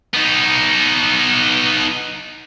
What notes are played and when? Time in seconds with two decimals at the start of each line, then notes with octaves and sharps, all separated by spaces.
0.14 B3 D#4